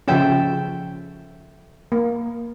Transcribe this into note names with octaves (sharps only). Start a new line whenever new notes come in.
C#3 F3 C#4 A4 E5 G5
A#3